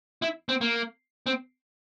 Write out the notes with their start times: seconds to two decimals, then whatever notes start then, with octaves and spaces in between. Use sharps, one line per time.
0.22 E4
0.49 C4
0.61 A#3
1.26 C4